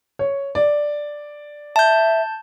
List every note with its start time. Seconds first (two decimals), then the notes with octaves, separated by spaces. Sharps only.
0.19 C#5
0.55 D5
1.76 E5 A5 G6